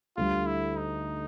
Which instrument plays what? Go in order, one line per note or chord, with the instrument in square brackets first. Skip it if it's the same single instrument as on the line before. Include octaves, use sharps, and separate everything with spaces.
[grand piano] D2 D3 G3 [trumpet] F4
[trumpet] E4
D#4